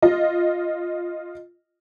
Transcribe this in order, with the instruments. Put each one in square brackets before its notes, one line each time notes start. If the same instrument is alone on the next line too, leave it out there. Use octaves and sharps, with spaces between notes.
[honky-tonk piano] F4 D#5